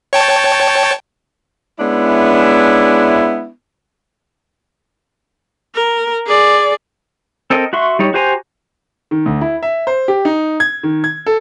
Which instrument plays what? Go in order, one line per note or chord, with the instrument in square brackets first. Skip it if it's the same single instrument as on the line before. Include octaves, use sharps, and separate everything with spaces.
[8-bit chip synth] C#5 G5 A5
[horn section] G#3 B3 C#4 D4 E4
[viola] A#4
G#4 D5
[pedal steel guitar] C4 A4 A#4 D#5
F#4 E5 C6 C#6
G3 D#4 C#5
F#4 G4 C5 G#5 A#5
[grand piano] D#3
D2
E4
E5
C5
G4
D#4
G#6
D#3
G#6
A4